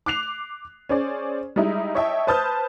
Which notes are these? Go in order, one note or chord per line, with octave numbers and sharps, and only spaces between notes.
D6 F#6 C7 F7
C#4 G#4 C5 D5
G3 G#3 D#4 E4
C#5 D#5 E5 G5 A5
B4 C5 A5 D#6 F6 G6